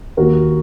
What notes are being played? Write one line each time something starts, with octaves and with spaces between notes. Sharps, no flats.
D#2 D#3 A#3 F#4 A#4